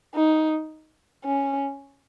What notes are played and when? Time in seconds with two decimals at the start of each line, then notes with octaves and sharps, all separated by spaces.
0.15 D#4
1.25 C#4